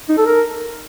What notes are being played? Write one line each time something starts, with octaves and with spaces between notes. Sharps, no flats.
D#4
A4
A#4